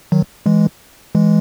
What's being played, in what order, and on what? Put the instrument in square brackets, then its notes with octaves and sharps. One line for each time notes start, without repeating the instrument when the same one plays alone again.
[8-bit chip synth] D#3 F#3
E3 G#3
E3 G#3